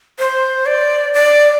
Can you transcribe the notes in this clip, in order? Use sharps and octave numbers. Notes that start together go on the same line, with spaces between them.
C5
D5
D5